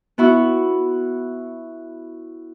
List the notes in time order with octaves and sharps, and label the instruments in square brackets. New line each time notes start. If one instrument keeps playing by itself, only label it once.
[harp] B3 E4 F#4